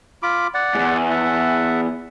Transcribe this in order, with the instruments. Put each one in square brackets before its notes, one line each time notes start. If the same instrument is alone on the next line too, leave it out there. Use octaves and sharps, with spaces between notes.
[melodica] F4 B5 D6
D5 F#5
[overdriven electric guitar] E2 G#2
[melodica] E5 F#5 A5